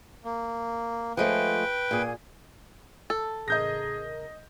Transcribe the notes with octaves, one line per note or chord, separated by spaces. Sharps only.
A#3
F3 G#3 A3 B4 G5
A#2 G#4
A4
A1 C#3 G#4 A#4 D#5 G6 A#6